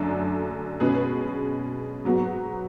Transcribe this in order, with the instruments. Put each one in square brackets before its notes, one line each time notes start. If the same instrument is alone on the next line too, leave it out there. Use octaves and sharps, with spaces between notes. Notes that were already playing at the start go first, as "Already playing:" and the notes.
Already playing: [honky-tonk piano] F#2 D3 F#3 A3 D4
B2 G#3 C#4 G#4 B4
G#2 F#3 B3 F#4